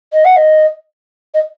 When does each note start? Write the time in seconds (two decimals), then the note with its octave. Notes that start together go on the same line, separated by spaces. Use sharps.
0.13 D#5
0.25 F#5
0.37 D#5
1.34 D#5